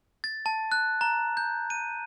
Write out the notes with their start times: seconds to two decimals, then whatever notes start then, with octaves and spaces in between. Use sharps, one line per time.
0.24 A6
0.46 A5
0.72 F#6
1.01 A#5
1.37 G6
1.70 D#7